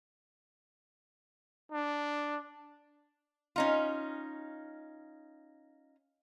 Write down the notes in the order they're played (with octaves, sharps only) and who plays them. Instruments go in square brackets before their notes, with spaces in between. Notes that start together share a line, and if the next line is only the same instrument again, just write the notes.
[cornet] D4
[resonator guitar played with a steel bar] C#4 D#4 F4